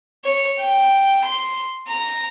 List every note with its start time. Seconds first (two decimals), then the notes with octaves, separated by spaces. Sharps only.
0.25 C#5
0.59 G5
1.25 C6
1.88 A#5